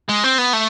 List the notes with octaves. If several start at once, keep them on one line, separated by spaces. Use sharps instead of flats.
G#3
C4
B3
A3